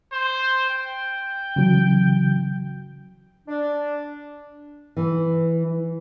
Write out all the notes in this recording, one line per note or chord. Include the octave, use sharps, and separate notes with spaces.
C5
G5
C#3 E3 F#3
D4
E3